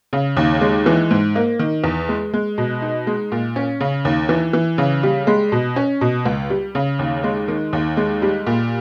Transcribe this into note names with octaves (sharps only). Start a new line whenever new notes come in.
C#3
D#2
G#3
E3
G#2
A#3
D#3
E2
G#3
G#3
B2
D#4
G#3
A#2
C#4
C#3
D#2
E3
E3
C#3
G3
G#3
B2
C#4
B2
C#2
G3
C#3
D#2
G#3
D#3
D#2
G#3
G3
A#2